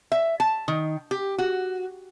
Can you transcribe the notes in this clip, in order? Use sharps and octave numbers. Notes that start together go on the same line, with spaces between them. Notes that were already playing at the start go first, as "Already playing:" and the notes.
E5
A5
D#3
G4
F#4